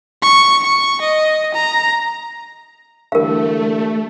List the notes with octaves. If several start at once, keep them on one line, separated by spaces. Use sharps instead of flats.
C#6
C#6
D#5
A#5
D3 E3 G3 A3 A#4 F5